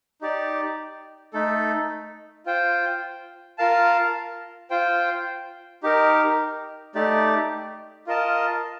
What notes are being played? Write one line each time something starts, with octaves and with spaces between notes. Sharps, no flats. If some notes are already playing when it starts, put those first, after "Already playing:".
D#4 G4 D5
A3 D#4 A4
F4 C5 G5
F4 A#4 F5 A5
F4 C5 G5
D#4 G4 A#4
A3 D#4 G4 D5
F4 A#4 D#5 A5